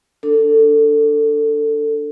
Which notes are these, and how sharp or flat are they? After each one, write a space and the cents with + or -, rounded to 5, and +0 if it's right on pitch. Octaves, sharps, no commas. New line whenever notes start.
D4 +0 A4 +20